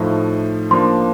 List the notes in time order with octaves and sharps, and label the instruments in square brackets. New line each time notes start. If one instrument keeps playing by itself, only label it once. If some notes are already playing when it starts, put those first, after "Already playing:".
Already playing: [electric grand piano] A2 F3 A3 D#4
[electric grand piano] F3 A#3 D4 [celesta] C6